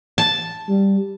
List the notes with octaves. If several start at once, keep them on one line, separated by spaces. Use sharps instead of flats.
A5
G3